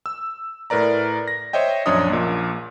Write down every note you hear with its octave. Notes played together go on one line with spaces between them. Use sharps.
E6
A2 A#4 B4 D5 A#5
A#6
C5 C#5 D#5 E5 G5
A#1 F#2 D4 C#5 D#5 D#6
A#1 A#2